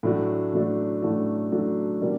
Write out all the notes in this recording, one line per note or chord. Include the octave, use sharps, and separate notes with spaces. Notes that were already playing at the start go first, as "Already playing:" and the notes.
A2 F#3 A3 D4 F#4
A2 F#3 A3 D4 F#4
A2 F#3 A3 D4 F#4
A2 F#3 A3 D4 F#4
B2 G3 A#3 D4